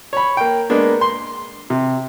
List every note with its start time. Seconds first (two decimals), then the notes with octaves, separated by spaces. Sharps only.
0.13 C#5 B5
0.37 A#3 G5
0.70 G#3 A#3 B3 D4
1.01 C6
1.70 C3